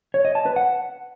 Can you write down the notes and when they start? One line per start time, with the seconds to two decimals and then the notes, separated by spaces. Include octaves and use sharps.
0.14 C#5
0.25 D#5
0.35 A5
0.46 B4
0.56 F#5